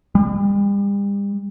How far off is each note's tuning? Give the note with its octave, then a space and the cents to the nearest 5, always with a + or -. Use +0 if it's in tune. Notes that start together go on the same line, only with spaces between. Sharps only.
G3 +40